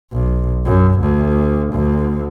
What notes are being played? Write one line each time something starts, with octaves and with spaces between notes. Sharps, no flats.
B1
F#2
D2
D2